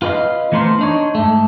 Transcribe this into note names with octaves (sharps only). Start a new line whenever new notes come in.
F4 B4 C#5 D#5 F5
E3 A3 B3 A#4 C5
D4 D#4 C#5
G#2 A3